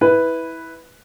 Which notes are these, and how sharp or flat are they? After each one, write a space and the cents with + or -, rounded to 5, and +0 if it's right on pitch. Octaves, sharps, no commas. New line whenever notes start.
E4 -15 B4 +0